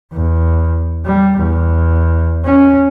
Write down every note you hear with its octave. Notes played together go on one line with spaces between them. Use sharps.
E2
G3
E2
C#4